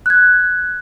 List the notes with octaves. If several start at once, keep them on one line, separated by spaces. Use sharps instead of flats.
F#6 G#6